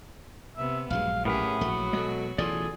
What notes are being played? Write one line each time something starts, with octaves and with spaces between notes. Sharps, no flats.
C3 B3 E5
A#1 G2 F#3 G#3 F5
A2 B3 C#4 G4 G#4 A#4 E5
A#1 F#3 A3 F#4
B2 G#3 A4
A1 B2 E3 F4 G#4 A4 D5